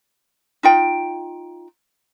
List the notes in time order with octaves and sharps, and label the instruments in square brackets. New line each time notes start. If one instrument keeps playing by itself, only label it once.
[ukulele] D#4 F4 G5